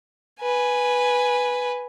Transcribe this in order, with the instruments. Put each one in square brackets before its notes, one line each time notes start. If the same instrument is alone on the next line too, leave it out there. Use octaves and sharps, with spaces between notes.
[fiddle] B4 G#5